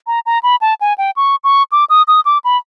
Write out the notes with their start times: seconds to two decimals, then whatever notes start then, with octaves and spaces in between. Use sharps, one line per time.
0.07 A#5
0.26 A#5
0.43 B5
0.61 A5
0.81 G#5
0.98 G5
1.17 C#6
1.44 C#6
1.72 D6
1.90 D#6
2.08 D#6
2.25 D6
2.44 B5